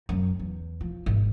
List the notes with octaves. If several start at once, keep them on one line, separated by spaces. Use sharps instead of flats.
F#2
E2
F3
G#1